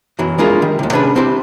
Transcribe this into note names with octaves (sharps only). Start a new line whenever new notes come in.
F#2 B2 E3 F#3
G#3 D4 E4 F4 G#4 A#4
D#3 G3
D#2 C3
C3 C#4 D4 G#4 B4
C4 E4 G4